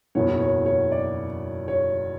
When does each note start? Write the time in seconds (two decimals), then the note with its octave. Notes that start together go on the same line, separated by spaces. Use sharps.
0.15 F#1 E2 B2 F#3 B3 C#5
0.41 C#5
0.66 C#5
0.91 D5
1.68 C#5